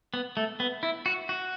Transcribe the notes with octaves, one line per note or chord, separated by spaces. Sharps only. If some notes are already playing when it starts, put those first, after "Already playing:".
B3
A3
B3
E4
F#4
F#4